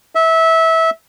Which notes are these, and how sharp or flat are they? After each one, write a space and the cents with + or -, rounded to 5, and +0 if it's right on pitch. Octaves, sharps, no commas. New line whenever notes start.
E5 -20